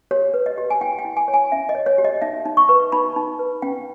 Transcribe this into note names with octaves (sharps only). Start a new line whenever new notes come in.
G4 C#5
B4
D#5
G4
G#5
E4 G5
G5
E4
G#5
C#5
G#5
C#4 E5
D#5
C#5
C#5
G4
D#5
D#4 E5
D#4
C#6
B4
D#4 B5
D#4
B4
C#4 G5